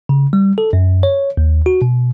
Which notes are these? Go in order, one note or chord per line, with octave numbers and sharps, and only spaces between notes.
C#3
G3
A4
F#2
C#5
D#2
F#4
B2